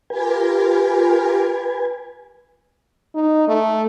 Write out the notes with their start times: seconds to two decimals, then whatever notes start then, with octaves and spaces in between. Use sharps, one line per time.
0.10 F4 G4 A#4 B4 G#5
3.15 D#4
3.48 A3